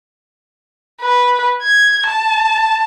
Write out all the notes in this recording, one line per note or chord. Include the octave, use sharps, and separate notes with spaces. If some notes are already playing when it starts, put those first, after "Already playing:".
B4
G#6
A5